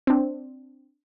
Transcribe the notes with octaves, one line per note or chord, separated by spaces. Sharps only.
C4 D4